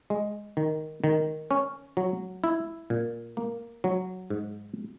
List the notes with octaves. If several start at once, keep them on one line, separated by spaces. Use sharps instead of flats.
G#3
D#3
D#3
C#4
F#3
E4
A#2
A#3
F#3
G#2